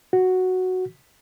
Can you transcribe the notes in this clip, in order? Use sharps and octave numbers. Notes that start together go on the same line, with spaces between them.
F#4